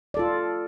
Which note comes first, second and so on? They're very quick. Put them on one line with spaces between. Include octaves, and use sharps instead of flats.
D5 A4 F4